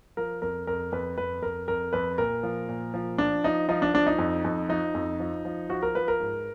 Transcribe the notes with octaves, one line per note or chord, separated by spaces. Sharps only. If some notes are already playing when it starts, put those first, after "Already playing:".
F3 A#4
F2 A#4
F2 A#4
F2 B4
F2 B4
F2 A#4
F2 A#4
F2 B4
A#2 A#4
F3
A#2
F3
F3 D4
F3 D#4
F3 D#4
D4
F3 D4
D#4
F2
F2
F3 D#4
F2
F3
F3
F3 F#4
A#4
F3 B4
A#4
G#2